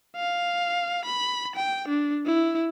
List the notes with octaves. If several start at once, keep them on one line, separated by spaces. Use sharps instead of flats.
F5
B5
G5
D4
E4